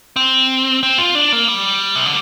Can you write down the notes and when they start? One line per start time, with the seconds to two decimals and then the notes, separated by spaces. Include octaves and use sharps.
0.16 C4
0.83 C4
0.98 F4
1.15 D4
1.33 A#3
1.48 G3
1.96 C3
2.05 D3